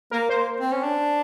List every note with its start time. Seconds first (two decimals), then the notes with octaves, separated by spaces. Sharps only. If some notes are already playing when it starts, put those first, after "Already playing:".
0.11 A#3 A#4
0.29 A#3 C5
0.60 C4
0.72 C#4
0.83 D4